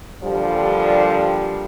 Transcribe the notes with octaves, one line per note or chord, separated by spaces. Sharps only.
A#2 D3 F3 G3